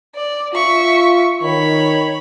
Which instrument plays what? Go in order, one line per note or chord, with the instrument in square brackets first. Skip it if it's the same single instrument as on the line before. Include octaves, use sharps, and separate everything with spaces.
[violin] D5
[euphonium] F4 [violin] E5 C#6
[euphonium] D#3 [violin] C#5 B5